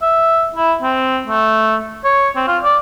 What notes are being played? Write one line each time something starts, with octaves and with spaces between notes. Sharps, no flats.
E5
E4
C4
A3
C#5
C4
F4
D5